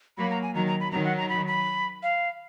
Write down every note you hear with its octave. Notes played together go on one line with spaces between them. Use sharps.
F#3 A#3 B5
A#5
G#5
D#3 F#3 A#5
A#5
B5
D#3 F#3 A#5
F#5
A#5
B5
B5
F5